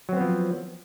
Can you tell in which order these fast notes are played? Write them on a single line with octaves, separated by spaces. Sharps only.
F#3 C4 B3 F3